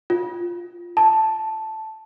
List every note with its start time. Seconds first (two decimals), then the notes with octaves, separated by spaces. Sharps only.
0.10 F4
0.97 A5